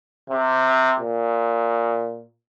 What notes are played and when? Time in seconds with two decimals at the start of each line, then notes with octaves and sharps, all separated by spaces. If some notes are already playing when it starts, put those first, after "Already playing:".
0.30 C3
1.00 A#2